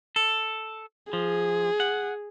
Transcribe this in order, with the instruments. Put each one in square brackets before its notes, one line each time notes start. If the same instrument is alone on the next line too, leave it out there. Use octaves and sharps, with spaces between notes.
[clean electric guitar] A4
[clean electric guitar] F3 [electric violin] G#4
[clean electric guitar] F#5